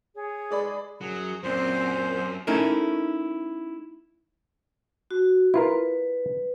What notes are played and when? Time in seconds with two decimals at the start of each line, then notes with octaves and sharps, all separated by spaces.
0.15 G#4 C#5
0.51 G#3 D5 B5
1.01 F#2 F#3 G#4
1.43 F#2 A#2 C4 C5
2.47 A3 C#4 D#4 E4 A4 A#4
5.11 F#4
5.54 E4 F4 A#4 B4